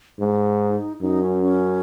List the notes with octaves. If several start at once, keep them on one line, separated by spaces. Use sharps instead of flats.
G#2 D#4
F#2 D#4
C#4
C#4